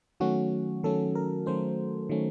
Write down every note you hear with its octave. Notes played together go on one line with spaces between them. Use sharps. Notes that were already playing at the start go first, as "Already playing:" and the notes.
D#3 F#3 A3 C#4 F#4
D#3 F#3 A3 C#4 A4
A#4
D#3 F#3 A3 C#4 C5
D#3 F#3 A3 C#4